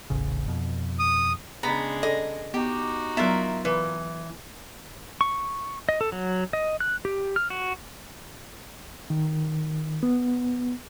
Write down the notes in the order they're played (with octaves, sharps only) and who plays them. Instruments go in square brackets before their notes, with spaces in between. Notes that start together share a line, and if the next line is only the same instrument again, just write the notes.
[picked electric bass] D#1 A1 C#3
F2 B2
[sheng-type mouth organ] D#6
[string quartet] C#3 G#3 D4 [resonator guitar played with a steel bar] B3 [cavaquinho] A#5 B5
[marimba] A4 [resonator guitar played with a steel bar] D#5
[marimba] B3 [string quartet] D#4 F#4 [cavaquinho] G4
[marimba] F#3 B3 [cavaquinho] E4 F4 A#4 [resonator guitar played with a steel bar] E5
[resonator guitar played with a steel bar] E3 [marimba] B4
[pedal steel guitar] C#6
D#5
A4
F#3
D#5
F#6
G4
F6
F#4
[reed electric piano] D#3
B3